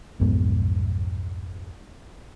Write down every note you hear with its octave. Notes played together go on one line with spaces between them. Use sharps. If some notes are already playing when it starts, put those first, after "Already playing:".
B1 F2 G#2 B3